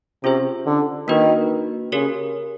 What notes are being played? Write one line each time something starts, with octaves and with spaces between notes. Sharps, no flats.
C3 C#4 F4 G#4 C5
D3
D#3 A#3 D4 F#4 B4
C#3 G4 A#4 C#5